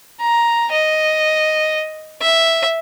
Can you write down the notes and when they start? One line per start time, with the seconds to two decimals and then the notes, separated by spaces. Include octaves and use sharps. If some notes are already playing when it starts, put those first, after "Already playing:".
0.21 A#5
0.72 D#5
2.21 E5